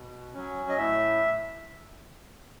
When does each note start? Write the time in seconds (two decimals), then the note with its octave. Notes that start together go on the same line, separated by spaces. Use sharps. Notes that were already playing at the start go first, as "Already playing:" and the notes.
Already playing: B2
0.33 F#3 C#4
0.69 D#5
0.76 A2 E5